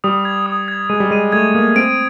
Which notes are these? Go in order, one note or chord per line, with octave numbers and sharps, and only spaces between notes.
G3 D#6
G#6
D#6
G#6
G#3 D#7
G3
G#3 D#7
A3 G#6
A#3 D#6
C4 D7